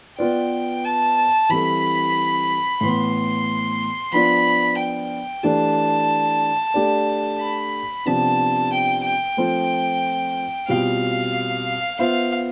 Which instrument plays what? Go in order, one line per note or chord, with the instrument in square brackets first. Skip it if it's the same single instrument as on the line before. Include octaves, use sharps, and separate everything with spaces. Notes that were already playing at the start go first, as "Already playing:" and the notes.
[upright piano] B3 F4 B4 D5 [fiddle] G5
[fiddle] A5
[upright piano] E3 G3 C4 E4 A4 [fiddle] B5
[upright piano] A2 E3 B3 [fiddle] C6
[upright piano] F3 B3 D4 F4 [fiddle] B5
[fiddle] G5
[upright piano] E3 A3 D4 G4 [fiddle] A5
[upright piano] A3 D4 G4 D5
[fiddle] B5
[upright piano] C3 F3 B3 D4 G4 [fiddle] A5
[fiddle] G5
G5
[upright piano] F3 A3 C4 F4 C5
[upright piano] B2 G3 C4 F4 [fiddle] F5
[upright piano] B3 F4 C5 E5 [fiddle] F5